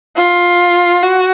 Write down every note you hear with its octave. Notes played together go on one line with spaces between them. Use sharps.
F4
F#4